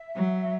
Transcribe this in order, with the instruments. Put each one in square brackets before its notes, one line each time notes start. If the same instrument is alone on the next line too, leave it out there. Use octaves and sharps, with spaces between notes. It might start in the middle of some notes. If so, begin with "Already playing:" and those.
Already playing: [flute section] E5
[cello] F#3